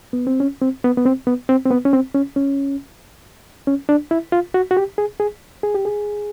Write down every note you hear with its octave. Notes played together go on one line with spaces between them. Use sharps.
B3
C4
C#4
C4
B3
B3
C4
B3
C4
C4
B3
C#4
C4
C#4
C#4
C#4
D4
E4
F4
F#4
F#4
G4
G#4
G#4
G#4
G4
G#4